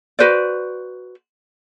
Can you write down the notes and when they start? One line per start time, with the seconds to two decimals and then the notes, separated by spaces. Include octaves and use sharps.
0.19 F#4 B4 C5 D5